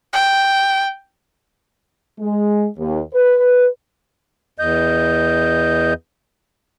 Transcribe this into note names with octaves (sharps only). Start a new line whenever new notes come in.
G5
G#3
D#2
B4
E2 D#5 G6